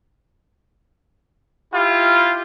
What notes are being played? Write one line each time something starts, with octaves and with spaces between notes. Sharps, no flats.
E4 F4 G4